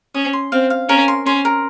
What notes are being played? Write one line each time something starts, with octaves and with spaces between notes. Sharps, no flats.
C#4 D#6
C6
C4 F5
F5
C#4 A#4
C6
C#4 C6
A#4